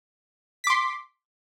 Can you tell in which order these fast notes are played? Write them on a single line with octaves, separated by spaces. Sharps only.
B6 D6 C6